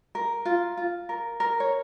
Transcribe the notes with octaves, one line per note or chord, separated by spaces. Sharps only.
A#4
F4
F4
A#4
A#4
C#5